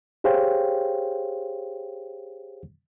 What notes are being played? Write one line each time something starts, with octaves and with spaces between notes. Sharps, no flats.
G4 G#4 C5 C#5 F5 G5